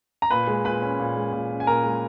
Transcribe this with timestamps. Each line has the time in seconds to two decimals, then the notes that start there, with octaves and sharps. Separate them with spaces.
0.22 A#5
0.30 A#2 B4 B5
0.47 G#3
0.65 A#2 B4 B5
0.82 C#4
1.00 A#2
1.17 G#3
1.33 A#2
1.51 C#4
1.60 G#5
1.67 A#2 A#4 A#5
1.84 G#3